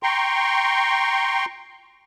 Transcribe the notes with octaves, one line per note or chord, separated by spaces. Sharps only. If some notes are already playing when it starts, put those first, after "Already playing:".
G5 A#5 C6 C#6